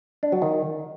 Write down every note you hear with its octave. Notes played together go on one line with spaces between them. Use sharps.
D4
F#3
D#3